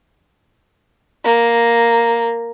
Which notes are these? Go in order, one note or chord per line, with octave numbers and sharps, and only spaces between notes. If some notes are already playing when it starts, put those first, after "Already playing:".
A#3